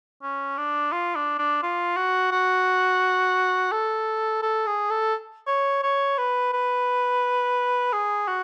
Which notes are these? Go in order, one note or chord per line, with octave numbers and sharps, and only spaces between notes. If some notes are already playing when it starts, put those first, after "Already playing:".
C#4
D4
F4
D4
D4
F4
F#4
F#4
A4
A4
G#4
A4
C#5
C#5
B4
B4
G#4
F#4